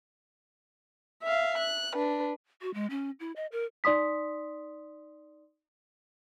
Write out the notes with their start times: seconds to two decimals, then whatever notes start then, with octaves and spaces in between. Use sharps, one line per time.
1.23 E5 F5
1.58 F#6
1.95 D4 B4
2.62 F#4
2.74 G#3
2.90 C#4
3.20 E4
3.36 D#5
3.52 A#4
3.84 D#4 D5 C6 D#6 B6